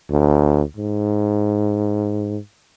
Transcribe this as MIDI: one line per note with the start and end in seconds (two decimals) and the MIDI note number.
0.10 0.62 38
0.77 2.38 44